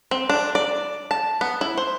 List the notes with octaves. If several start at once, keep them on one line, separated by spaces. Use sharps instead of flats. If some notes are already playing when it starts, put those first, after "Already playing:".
C4
D4
D5
A5
B3
E4
C5